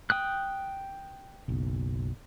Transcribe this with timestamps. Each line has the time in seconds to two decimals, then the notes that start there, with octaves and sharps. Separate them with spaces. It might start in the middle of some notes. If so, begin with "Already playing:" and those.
0.10 G5 D#6 F#6
1.48 F#1 B1